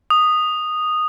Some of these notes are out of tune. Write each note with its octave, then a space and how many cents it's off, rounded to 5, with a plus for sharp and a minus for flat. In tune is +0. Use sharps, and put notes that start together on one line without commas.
D#6 -10